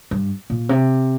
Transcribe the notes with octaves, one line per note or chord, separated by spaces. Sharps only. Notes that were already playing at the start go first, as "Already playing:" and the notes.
G2
A#2
C3